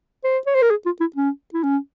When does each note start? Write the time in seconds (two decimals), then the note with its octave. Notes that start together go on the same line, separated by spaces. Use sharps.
0.24 C5
0.46 C#5
0.55 C5
0.62 A#4
0.70 G#4
0.85 F4
1.00 E4
1.16 C#4
1.54 E4
1.63 C#4